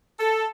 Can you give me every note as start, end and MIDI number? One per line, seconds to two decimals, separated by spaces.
0.20 0.46 69